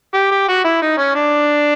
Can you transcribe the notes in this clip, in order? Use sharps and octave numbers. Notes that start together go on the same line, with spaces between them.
G4
G4
F#4
E4
D#4
C#4
D4